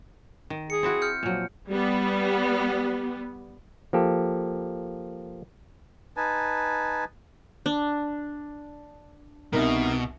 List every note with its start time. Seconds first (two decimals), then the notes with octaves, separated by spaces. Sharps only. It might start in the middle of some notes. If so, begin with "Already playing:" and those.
0.50 D#3
0.70 G#4 C#7
0.83 C4 E4 F#4
1.02 F6 G6 C#7
1.23 A#2 F3 F#3
1.69 G3 B3
3.93 F3 A#3 G4 A4
6.17 D#4 B4 G#5 A5
7.66 D4
9.53 C2 B2 D#4 A#4